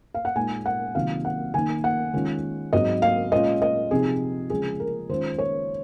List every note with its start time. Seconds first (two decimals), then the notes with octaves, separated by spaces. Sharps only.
0.14 F5
0.25 F#5
0.36 A#2 G#3 D#4 G#5
0.66 F#5
0.95 C3 D#3 F#3 A#3 F4 F5
1.25 F#5
1.54 D#3 A#3 D#4 G#5
1.84 F#5
2.14 D#3 G#3 C#4 F4
2.73 G#2 F#3 C4 D#5
3.02 F5
3.32 A#2 G#3 C#4 F4 D#5
3.62 D#5
3.91 C3 F3 C4 D#4 G#4
4.50 C#3 F3 G#3 G#4
4.80 A#4
5.09 D#3 G#3 C#4 F4 C5
5.39 C#5